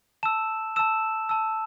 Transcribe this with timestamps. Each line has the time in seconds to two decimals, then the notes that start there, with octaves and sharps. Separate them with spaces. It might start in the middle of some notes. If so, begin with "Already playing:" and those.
0.23 A5 E6 E7
0.76 A5 E6 E7
1.29 A5 E6